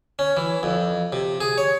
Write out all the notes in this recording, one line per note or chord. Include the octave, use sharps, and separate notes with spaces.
C#4
E3
F2
C3
G#4
C#5